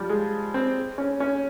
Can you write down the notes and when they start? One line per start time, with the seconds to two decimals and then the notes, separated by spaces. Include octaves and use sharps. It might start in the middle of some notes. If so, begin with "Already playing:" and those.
Already playing: F3 G3
0.09 G#3
0.54 C4
0.98 C#4
1.20 C#4